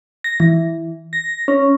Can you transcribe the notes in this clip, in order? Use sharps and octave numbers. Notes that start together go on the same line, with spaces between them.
A#6
E3
A#6
C#4